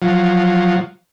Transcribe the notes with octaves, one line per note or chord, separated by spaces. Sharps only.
F3 F#3